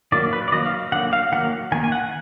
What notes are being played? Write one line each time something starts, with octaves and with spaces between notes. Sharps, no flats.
D#3 F#3 A#3 D5
B4
D5
D#3 F#3 A#3 D#5
F5
D3 F#3 A#3 F#5
F5
D#3 F#3 A#3 F#5
D#3 A#3 G#5
G#5
F#5